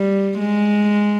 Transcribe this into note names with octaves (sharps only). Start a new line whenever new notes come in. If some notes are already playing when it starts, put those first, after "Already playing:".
Already playing: G3
G#3